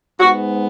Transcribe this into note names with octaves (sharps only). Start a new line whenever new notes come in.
G#2 G#3 B3 F#4